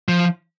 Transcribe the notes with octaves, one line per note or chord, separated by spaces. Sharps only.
F3